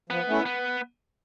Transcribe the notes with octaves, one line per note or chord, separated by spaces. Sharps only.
F3 B3
A3 C#4 E4
B3